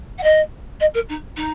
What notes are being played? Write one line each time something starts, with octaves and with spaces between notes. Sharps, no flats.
F#5
D#5
D#5
A#4
D#4
D#4